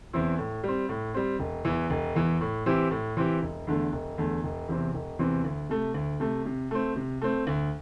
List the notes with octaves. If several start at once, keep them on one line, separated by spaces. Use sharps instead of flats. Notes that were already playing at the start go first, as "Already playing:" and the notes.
E2 E3 C4 E4
A2
G3 C4
A2
G3 C4
E1
E2 E3
E1
E2 E3
A2
E3 C4 E4 G4
A2
E3 C4 E4 G4
E1
E2 D3 A3
E1
E2 D3 A3
E1
E2 C3 E3 C4
E1
E2 C3 E3 C4
D2
C3 A3
D2
C3 A3
C3
A3 C4
C3
A3 C4
D2